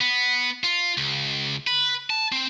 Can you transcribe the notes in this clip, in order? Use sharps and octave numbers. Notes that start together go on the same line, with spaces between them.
B3
F4
C#2
B4
A5
C4